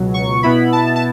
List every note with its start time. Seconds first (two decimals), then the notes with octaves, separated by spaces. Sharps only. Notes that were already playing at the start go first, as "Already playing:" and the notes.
Already playing: C#2 B2 F#3
0.14 C#6
0.43 B2 B3 E4 B5
0.73 A5
0.96 A5